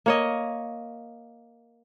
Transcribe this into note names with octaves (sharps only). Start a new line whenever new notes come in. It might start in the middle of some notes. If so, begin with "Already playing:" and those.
A#3 C#5 D#5